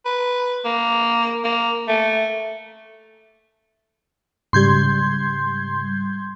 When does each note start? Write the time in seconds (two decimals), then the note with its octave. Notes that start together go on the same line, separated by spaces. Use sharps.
0.06 B4
0.65 A#3
1.44 A#3
1.88 A3
4.53 G#2 C#3 G3 C6 G6 G#6